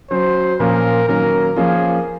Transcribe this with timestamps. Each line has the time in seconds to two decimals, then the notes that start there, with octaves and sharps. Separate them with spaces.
0.10 F#3 C#4 F#4 C5
0.60 A#2 F3 A#3 C#4 F4 A#4
1.08 D#3 F#3 A#3 C#4 A#4
1.56 F3 A#3 C#4 F4 G#4